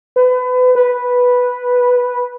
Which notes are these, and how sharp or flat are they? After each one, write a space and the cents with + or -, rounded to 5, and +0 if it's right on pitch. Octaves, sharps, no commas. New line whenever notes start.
B4 +30
B4 -5